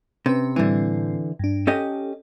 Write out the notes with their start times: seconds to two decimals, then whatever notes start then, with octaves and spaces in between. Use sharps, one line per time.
0.26 C3 C#4 B4
0.56 A2 D3 E3 G3 C4
1.39 G2 D4
1.67 C#4 G4 A4 D#5